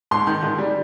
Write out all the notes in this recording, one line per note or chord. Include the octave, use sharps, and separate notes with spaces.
G#2 C6
D#3
G#2
G3